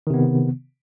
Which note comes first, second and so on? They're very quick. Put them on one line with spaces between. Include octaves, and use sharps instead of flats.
D#3 C3 B3